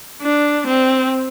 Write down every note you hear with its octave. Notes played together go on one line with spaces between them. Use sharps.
D4
C4